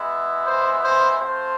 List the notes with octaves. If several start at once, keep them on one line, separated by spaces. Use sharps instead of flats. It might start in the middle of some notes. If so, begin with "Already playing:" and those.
Already playing: G#3 B3 E4
C5
C5
A3 C4 F4 C5